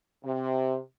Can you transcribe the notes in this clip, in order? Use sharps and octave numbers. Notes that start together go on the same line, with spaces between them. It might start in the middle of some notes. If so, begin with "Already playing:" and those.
C3